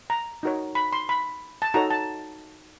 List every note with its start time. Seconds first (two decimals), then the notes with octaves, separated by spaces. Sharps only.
0.10 A#5
0.43 D#4 F#4 A#4 C#5
0.75 B5
0.93 C6
1.09 B5
1.62 A5
1.74 D#4 F#4 A4 C#5 A#5
1.90 A5